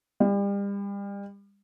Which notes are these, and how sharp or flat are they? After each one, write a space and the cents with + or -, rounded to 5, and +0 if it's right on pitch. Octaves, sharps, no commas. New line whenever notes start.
G3 +35